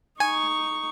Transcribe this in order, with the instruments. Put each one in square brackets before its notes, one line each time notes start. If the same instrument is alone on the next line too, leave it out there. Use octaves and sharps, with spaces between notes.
[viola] D#4 C#6 [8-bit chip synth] G#5